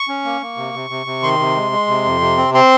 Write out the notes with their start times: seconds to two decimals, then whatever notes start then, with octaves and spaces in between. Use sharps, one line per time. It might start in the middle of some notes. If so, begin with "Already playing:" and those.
Already playing: C#6
0.08 C#4
0.25 A#3
0.41 A#3
0.57 C3
0.74 C3
0.90 C3
1.06 C3
1.23 D#3 C6
1.39 C3
1.56 G#3
1.72 G#3
1.88 C3
2.05 F2
2.21 C3
2.37 C4
2.54 C4 C6